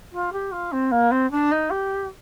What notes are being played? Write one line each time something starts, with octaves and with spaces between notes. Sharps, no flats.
F4
G4
F4
C4
A#3
C4
D4
D#4
G4